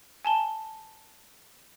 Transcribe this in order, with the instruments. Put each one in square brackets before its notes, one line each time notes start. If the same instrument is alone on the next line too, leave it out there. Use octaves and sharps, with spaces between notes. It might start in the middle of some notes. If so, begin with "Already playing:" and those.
[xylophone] G#5 A5 G7